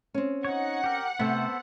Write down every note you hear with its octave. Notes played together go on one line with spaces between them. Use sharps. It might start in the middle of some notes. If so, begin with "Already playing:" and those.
C4 C#4
D#4 C#5 F#5
G4 A#4
C3 A3 B3 A4 C5